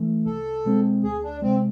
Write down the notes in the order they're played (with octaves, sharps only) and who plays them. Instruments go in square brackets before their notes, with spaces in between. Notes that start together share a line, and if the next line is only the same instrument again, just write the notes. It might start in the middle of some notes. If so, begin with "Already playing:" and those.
Already playing: [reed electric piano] E3 A3
[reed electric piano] C2 [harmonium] A4
[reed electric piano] B2 G#3 C4
[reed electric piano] D2 [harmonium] G#4
[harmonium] D4
[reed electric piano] C3 G#3 [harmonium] C4